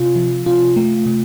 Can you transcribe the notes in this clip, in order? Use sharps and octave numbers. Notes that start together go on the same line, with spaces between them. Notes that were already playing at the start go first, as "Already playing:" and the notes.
Already playing: C3 F4
F3
C3 F4
A3
C3